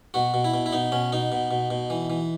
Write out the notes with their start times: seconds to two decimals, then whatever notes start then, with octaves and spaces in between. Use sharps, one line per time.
0.14 B2 F#4
0.34 B2
0.44 E4
0.54 B2
0.66 E4
0.73 B2 D#4
0.92 B2 C#4
1.12 B2 D#4
1.32 B2
1.51 B2
1.71 B2
1.90 E3
2.10 E3